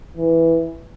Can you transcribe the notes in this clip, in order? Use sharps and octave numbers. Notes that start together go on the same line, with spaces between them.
E3